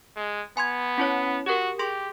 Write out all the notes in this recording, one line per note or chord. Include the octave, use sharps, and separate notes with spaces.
G#3
B3 G#5 C6 G#6
C#4 E4 C#5
F#4 G4 A#4
G4 G#4 C6 A#6